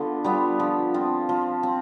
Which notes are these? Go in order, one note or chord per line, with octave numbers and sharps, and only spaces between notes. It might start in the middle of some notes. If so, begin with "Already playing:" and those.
Already playing: D3 B3 F4
G3 B3 F4
F3
C4 F4
F3
C4